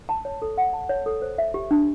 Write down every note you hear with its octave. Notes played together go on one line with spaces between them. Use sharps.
A5
C#5
A4
F#5
A5
C#5
A4
C5
E5
G4
D4